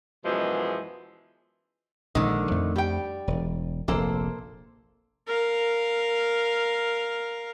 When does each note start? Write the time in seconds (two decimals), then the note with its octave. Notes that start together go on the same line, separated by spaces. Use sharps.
0.25 F#2 B2 E3 F3 G#3
2.15 A#1 D3 D#3 G#3
2.51 F2 A3
2.76 G3 G5
3.28 E1
3.88 F1 A#1 A#3 A4 C5
5.27 A#4 F5